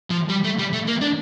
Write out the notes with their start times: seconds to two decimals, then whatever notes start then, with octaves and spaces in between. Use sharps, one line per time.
0.10 F3
0.29 G3
0.44 A3
0.58 G3
0.73 A3
0.87 A#3
1.01 D4